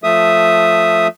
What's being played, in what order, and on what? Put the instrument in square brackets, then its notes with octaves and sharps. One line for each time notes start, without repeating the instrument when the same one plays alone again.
[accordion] F3 A3 E5 D#6